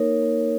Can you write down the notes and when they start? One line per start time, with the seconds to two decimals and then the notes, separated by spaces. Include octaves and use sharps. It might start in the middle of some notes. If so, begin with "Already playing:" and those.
Already playing: A#3 D#4 A#4 C#5
0.22 A#3